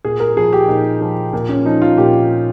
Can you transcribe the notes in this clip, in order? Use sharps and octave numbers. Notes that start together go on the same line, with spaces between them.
A#2 G#4
A#4
F3 G#4
G4
A#2 D#4
F3
A#2
C#4
F3 D#4
F4
A#2 G4